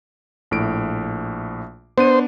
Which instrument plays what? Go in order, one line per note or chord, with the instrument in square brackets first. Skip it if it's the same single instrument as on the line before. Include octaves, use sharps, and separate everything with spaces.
[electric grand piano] A#1 A2 D7
[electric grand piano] B3 D4 D#7 [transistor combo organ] C5